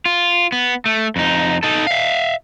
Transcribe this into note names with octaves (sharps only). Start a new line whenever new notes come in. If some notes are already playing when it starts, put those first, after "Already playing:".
F4
B3
A3
F2 D#4
D#4 A4
E5 F5